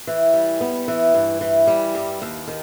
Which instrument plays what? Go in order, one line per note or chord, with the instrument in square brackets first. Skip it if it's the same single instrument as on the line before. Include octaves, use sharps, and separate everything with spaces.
[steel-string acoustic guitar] E3
G3
B3
E3
G2
E3
G3
G2
D#2
D#3